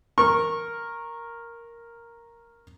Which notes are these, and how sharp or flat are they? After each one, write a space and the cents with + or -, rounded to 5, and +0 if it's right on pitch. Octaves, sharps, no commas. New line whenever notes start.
A#4 +0 C#6 -25